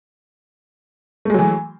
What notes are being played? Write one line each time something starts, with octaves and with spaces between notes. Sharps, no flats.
E3 F#3 G#3 A3